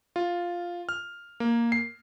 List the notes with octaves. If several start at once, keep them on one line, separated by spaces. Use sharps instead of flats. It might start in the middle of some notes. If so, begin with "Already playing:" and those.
F4
F6
A#3
C7